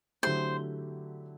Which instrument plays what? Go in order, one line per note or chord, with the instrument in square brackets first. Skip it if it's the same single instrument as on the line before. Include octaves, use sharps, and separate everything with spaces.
[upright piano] D3 F#3 A3 E4 G4 [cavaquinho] C5